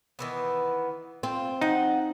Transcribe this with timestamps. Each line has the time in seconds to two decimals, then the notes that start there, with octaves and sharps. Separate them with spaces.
0.19 D#3 E3 B3
1.23 C4 F4
1.61 F3 D#4 F#5